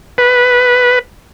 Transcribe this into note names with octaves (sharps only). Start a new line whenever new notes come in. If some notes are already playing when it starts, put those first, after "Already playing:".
B4